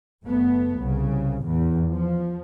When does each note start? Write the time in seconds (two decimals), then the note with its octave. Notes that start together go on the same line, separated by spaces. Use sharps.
0.23 F#1 A3 B3
0.77 C2 C#3
1.43 E2 A2
1.87 F3